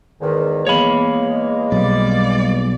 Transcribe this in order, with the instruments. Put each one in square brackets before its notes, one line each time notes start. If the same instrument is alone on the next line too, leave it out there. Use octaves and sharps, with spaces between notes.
[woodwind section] E2 G#2 D#3
[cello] E2 [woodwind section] E3 G#3 A#3 [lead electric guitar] C#5 B5
[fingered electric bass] B1 [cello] G3 D5